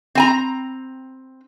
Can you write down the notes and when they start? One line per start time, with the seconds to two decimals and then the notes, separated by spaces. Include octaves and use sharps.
0.15 C4 G#5 A#5